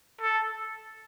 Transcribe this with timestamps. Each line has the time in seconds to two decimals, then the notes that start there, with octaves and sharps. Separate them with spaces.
0.21 A4